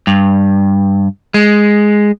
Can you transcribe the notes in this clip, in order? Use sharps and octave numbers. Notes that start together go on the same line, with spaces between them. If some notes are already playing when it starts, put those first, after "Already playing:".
G2
G#3